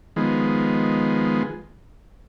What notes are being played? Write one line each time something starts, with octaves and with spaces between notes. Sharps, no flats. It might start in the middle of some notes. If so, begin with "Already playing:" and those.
D#3 F3 G#3 B3